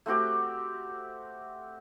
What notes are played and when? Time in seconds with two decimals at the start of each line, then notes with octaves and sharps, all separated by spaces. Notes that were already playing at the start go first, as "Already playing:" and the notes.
0.06 A3 C4 F#4 G4